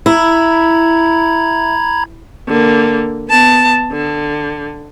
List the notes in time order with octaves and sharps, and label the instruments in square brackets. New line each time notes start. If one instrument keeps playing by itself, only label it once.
[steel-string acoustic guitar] E4 [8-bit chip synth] A#5 B5 G#6
[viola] D3 A#3
B3 A5
D3